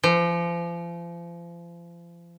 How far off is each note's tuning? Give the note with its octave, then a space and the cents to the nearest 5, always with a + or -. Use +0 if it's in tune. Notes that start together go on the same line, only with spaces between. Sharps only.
F3 -35